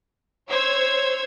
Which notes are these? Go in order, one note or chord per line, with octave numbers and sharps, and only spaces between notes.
C5 C#5 E6 G#6